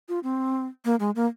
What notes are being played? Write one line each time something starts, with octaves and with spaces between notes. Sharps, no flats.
F4
C4
A#3
G#3
A#3